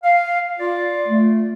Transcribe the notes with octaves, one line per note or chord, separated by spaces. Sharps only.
F5
F4 D5
A3